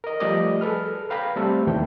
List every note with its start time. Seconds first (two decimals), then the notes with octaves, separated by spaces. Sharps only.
0.04 A#4 D#5
0.20 F3 G3 A3 G4 D5 D#5
0.61 G#4 A4 B4 F6
1.10 B4 F5 G5 A#5 B5
1.36 G3 A3 C4 A4
1.67 D#2 E3 G5